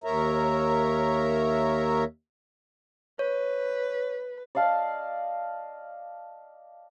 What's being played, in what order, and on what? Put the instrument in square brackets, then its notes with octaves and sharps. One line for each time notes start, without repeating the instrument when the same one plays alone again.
[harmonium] D#2 A#4 C#5 E5 A#5
[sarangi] B4 [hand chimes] C#5
[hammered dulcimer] D5 D#5 F5 A5